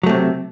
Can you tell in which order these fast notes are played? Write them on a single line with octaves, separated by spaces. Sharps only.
F#3 A3 C3